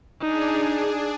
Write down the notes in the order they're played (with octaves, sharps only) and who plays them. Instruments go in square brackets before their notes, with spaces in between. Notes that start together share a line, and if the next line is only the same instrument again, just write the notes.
[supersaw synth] D4 G#4 [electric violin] D#4